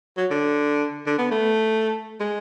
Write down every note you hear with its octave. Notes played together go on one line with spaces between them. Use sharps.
F#3
D3
D3
B3
A3
G#3